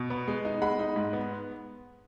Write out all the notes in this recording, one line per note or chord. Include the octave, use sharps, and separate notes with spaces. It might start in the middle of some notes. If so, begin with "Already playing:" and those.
Already playing: B2
B3
G#3
D#4
G#3 F#5 B5
D#4
G#2
B3